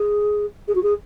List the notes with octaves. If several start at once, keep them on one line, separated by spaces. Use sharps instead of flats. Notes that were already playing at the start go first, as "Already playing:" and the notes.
Already playing: G#4
G#4
F#4
G#4